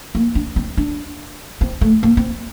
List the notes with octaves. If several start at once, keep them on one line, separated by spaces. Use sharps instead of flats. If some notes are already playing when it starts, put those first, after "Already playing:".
A#3
D4
C4
D4
C4
A3
A#3
C4